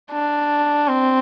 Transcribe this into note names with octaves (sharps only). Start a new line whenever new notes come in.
D4
C4